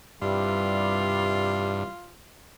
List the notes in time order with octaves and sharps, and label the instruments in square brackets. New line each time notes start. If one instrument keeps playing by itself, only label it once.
[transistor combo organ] G2 [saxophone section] C3 E3 G3 [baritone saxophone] F4